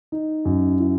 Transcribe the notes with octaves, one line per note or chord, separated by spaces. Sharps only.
D#4
F#2
E4